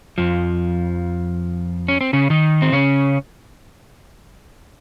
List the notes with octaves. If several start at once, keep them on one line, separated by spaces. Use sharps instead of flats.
F2 F3
C#4
C4
C#3 C#4
D#3 D#4
C4
C#3 C#4